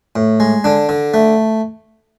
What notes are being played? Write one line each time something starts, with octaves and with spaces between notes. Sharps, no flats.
A2
G#3
D3 D4
D3
A3